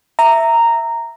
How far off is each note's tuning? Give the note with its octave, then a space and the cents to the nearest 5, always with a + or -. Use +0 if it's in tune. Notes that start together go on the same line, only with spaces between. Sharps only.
E5 +0 A#5 -10